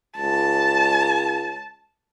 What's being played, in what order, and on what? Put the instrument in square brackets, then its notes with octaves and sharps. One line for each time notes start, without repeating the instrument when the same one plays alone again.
[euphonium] C#2 [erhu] A5